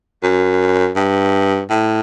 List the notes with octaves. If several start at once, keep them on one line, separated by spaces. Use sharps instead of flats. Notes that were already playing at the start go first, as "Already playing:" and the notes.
F#2
G2
A2